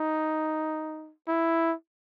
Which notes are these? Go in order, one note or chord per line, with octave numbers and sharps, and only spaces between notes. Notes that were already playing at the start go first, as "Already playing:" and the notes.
Already playing: D#4
E4